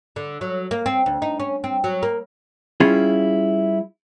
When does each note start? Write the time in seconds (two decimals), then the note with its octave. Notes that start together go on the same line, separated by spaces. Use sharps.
0.16 D3
0.41 F#3
0.71 A#3
0.86 C4
1.06 D2
1.22 D#4
1.40 C#4
1.64 C4
1.84 F#3
2.03 A#3
2.80 G3 C#4 E4 F4 G#4